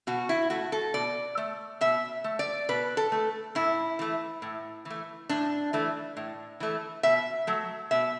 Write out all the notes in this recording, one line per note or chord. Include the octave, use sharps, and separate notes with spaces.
B2 F#4
E4
A3 F#4
A4
B2 D5
A3
B2 E5
A3
D5
B2 B4
A4
A3
A2 E4
E3 A3
A2
E3
A3
A2 D4
E3 A3
A2
E3 A3
B2 E5
F#3 A3
B2 E5